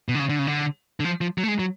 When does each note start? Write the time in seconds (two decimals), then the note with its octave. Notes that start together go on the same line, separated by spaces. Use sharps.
0.08 B2
0.15 D3
0.19 C#3
0.29 D3
0.39 C#3
0.47 D3
1.00 D3
1.05 F3
1.21 F3
1.38 F#3
1.44 A3
1.48 G#3
1.59 F#3